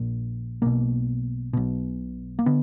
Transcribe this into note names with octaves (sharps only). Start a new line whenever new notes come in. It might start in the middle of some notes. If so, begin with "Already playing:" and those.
Already playing: A#1 A#2
B1 B2 A#3
B1 B2
A#3
D3 B3